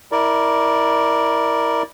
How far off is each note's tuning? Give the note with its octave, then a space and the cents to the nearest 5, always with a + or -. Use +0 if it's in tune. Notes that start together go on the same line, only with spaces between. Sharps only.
E4 -20 A#4 +0 D5 +0